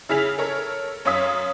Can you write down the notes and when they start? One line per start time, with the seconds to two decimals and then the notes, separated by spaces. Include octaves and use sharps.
0.09 C#3 E4 G#4 B6 F7
0.38 A4 A#4 C#5
1.05 F#2 C#4 C#5 F5 D#6 B6